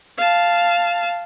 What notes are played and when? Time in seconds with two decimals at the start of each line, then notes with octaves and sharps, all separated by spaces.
0.17 F5 A5